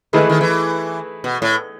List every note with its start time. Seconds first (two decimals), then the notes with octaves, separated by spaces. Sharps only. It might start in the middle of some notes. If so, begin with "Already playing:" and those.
0.13 D#3 A3 E4 G#4 B4 D#5
0.21 E3
0.29 D#3
0.41 E3
1.24 B2
1.42 A2